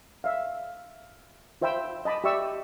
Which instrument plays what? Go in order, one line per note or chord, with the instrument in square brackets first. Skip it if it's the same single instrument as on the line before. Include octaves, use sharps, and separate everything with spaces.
[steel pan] E5 F5
F4 C5 E5 G5 B5 E6
D#5 A5 B5 D6 D#6
G4 D5 E5 C#6 E6